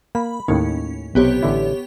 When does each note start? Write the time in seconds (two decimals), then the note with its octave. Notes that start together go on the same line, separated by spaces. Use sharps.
0.15 A#3 B5
0.48 D#2 A2 D#3 C#4
1.15 B1 C3 B3 G4 C#5
1.43 A1 D3 E4